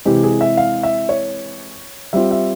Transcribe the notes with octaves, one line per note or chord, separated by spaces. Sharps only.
C3 E3 G#3 G4
G#4
E5
F5
E5
C#5
G3 C4 F4 E5
E5